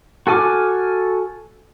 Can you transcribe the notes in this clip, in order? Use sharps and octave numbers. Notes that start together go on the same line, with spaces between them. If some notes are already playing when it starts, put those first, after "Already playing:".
F#4 A4 G#5 D6 F6